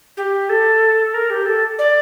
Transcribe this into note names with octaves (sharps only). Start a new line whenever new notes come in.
G4
A4
A#4
G4
A4
D5